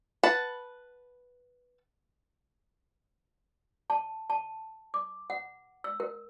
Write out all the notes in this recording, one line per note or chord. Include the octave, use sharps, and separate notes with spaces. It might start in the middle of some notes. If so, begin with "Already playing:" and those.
B4 F#5 A5
A5
A5
D6
F#5
E6
A#4